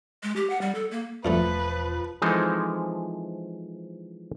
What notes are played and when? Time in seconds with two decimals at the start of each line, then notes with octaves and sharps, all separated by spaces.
0.23 G#3
0.36 G4
0.50 F#5
0.61 G3
0.75 A4
0.91 A#3
1.25 E1 G2 D3 F3 A3 B4
2.22 E3 F3 G#3 C4 D#4 A4